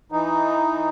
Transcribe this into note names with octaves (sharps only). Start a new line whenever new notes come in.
E3 D#4